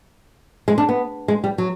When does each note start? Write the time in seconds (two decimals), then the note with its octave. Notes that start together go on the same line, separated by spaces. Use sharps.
0.68 G#3
0.78 D4
0.89 B3
1.28 G#3
1.44 G3
1.58 F#3